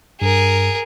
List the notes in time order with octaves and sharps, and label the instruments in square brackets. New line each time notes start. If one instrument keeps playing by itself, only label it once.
[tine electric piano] G2 [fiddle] G#4 A#4